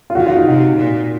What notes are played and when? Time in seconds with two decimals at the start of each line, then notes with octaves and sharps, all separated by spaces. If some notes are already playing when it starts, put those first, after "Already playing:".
0.10 F4
0.15 D#3 F#4
0.26 F4
0.36 D#4
0.46 C3 F#4
0.76 A#2